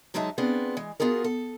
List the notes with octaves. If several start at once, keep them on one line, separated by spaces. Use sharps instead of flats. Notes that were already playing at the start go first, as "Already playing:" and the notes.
D3 F#3 G#3 D#4 E5 A5
B3 C4 D4 F4 G#4
E3 G#3
B3 F4 F#4 G#4 A#4
A4